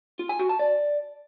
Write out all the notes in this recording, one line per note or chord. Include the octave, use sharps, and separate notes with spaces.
F4
G#5
F#4
A5
D5